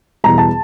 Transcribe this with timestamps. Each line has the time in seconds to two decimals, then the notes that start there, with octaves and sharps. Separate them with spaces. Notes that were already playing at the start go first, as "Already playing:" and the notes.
0.24 E2 B2 G3 A#5
0.38 A5